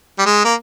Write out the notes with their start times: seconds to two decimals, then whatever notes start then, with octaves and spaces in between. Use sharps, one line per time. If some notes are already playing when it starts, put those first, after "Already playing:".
0.19 G3
0.26 G#3
0.45 A#3